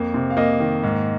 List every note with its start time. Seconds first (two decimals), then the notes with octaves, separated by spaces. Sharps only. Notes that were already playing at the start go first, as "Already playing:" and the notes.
Already playing: F2 A#3
0.14 C3
0.30 F5
0.37 A#3 D#5
0.60 D#3
0.83 G#2